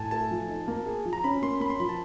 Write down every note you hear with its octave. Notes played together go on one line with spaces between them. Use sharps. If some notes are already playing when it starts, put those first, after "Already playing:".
Already playing: A2 G#5 A5
A3 A5
F3
D#4
A#3
G#4
F3
A#5
C#4 B5
A#3 C6
A#3 B5
C6
F3 B5
A5